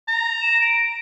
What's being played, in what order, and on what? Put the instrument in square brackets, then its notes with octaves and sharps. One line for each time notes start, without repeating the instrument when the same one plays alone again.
[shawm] A#5
[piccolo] E7
D7